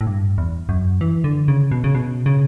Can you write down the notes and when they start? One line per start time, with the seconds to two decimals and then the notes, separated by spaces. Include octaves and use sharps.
0.01 A2
0.07 G2
0.38 E2
0.69 F#2
1.01 E3
1.24 D3
1.48 C#3
1.72 B2
1.84 C#3
1.95 B2
2.26 C#3